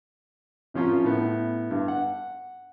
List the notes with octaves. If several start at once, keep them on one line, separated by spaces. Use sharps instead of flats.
C3 F3 C#4 F4 A#4
A2 B3
G2
F#5